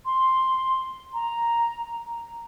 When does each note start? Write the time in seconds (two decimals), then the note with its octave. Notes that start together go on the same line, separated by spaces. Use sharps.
0.05 C6
1.14 A#5